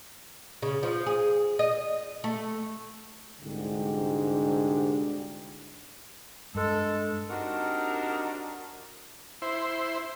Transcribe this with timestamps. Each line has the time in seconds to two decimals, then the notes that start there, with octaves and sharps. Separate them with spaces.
0.62 C#3
0.83 F3
1.06 G#4
1.59 D#5
2.24 A3
3.41 C2 G#2 D3 D4 F#4 G4
6.55 G2 G#3 A4
7.29 C4 D4 D#4 F#4 G4 A#4
9.42 E4 C5